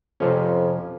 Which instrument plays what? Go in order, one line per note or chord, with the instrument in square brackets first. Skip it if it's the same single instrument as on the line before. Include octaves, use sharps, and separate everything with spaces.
[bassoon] F2 [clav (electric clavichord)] C3 F3 C#4